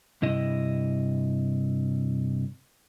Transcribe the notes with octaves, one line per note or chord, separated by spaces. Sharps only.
G2 C3 E4 D#5